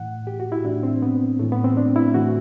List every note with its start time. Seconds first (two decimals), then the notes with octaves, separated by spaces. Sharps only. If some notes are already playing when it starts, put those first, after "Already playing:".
Already playing: A2 E3 F#5
0.27 G4
0.40 F#4
0.52 E4
0.64 A2 E3 D4
0.83 C4
1.02 B3
1.39 A2 E3 A3
1.52 B3
1.64 C4
1.77 D4
1.96 E4
2.14 A2 E3 F#4